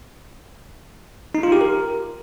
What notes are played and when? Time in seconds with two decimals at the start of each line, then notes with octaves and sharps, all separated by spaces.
1.35 D#4
1.43 F4
1.52 G4
1.61 A#4